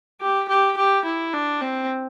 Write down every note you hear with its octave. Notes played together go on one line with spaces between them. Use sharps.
G4
G4
G4
E4
D4
C4